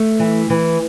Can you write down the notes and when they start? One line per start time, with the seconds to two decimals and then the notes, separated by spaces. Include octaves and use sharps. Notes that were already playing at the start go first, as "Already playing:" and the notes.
Already playing: A3
0.19 E3
0.50 E3